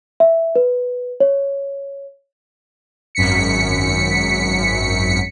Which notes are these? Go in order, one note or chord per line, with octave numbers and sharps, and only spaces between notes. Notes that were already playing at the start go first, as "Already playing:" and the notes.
E5
B4
C#5
G#1 F#2 B6 C#7